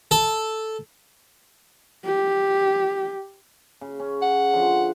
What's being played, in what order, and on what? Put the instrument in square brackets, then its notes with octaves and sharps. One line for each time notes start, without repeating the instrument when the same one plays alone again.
[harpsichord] A4
[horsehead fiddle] G4
[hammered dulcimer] C#3
C#4
[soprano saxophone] F#5
[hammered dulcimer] D3 F3